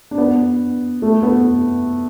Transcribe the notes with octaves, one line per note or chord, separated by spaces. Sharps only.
D4
B3
A3
B3